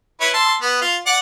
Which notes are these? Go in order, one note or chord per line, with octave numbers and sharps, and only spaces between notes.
E4 B4 C#5
A5 C6 E6
B3
F4
D5 F#5